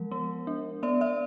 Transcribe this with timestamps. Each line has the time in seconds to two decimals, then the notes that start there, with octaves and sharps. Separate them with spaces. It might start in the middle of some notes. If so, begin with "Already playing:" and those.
Already playing: F3 G#3 A#4
0.11 B3
0.47 D4
0.83 B3 D5 E5
1.01 D5 E5